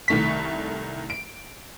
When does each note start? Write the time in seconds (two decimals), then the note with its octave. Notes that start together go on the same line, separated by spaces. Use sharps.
0.08 C2 D#3 A3 C#6 B6
1.10 D7